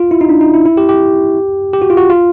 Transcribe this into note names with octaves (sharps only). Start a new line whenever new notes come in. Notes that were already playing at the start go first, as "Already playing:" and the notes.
Already playing: F4
E4
D#4
D4
D#4
E4
E4
G4
G4
G4
F#4
F4
F#4
F4